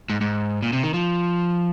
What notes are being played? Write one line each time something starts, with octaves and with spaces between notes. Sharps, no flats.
G#2
G#2
A#2
C3
D#3
F3